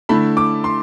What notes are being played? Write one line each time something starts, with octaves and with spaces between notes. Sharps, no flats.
D3 A3 E4 B5
D6
C6